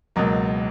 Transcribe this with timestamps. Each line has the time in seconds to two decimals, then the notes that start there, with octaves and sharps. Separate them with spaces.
0.16 C#2 B2 F#3 A#3